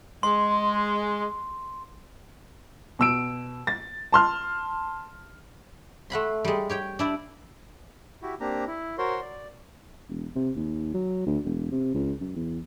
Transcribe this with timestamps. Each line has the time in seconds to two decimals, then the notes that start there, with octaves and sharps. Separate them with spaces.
0.23 G#3 C6
2.99 B2 E6 D7
3.67 A6
4.13 A5 C6 F6
6.10 A3 F#5 B5 C6
6.44 G3 G#3
6.70 G4 C#5 G5
6.99 D4 E4 D5
8.22 E4 F#4 G4
8.40 A#3 C4 D4 G4 A#5
8.67 E4
8.98 F#4 A#4 C5 C#5 C6
9.21 D5
10.09 E1
10.36 C3
10.56 D#2
10.94 F#3
11.26 D2
11.45 E1
11.72 C3
11.94 C#2
12.21 F#2
12.36 E2